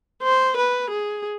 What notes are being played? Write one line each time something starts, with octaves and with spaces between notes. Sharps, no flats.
C5
B4
G#4